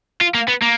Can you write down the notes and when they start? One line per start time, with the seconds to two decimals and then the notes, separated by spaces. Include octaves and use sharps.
0.21 F4
0.34 A#3
0.48 B3
0.62 A#3